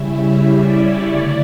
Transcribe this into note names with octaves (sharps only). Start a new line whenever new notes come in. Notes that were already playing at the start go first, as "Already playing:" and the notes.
Already playing: C#3 G3 C#4 E4 E5
D5
C#5
D3 F#3 A3 E4 D5